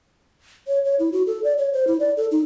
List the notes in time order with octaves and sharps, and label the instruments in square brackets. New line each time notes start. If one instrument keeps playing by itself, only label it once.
[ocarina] C#5
C#5
E4
F#4
A4
D5
C#5
C5
E4
D5
A4
D#4